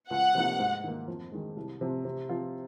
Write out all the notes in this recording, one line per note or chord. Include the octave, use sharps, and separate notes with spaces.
C#2 F#5
C3 F3 A#3 D#4
G#2
D#3 A#3
F2
D#3 G#3
C2
C3 F3 C4
C3
F3 C4 F4